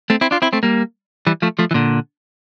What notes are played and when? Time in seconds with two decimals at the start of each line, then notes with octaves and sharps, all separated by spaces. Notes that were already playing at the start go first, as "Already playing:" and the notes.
0.10 A3 C4
0.21 C4 E4
0.31 D4 F4
0.42 C4 E4
0.53 A3 C4
0.63 G3 A#3
1.27 E3 G3
1.42 F3 A3
1.59 F3 A3
1.71 E3
1.74 A#2 D3